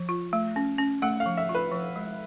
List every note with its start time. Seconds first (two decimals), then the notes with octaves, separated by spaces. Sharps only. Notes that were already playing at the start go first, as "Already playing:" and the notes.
Already playing: F3
0.09 F4
0.33 A3
0.56 C#4
0.78 C#4
1.02 A3 F#5
1.20 F5
1.26 F3
1.37 E5
1.49 F4
1.55 B4
1.72 F3
1.96 G#3